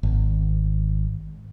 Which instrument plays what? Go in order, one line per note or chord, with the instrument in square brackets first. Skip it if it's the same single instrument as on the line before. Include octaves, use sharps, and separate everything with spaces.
[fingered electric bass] G#1